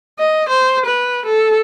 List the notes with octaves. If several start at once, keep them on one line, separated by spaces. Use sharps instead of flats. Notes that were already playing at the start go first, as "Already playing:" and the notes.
D#5
C5
B4
A4